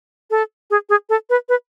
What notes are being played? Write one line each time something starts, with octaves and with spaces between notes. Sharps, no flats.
A4
G#4
G#4
A4
B4
B4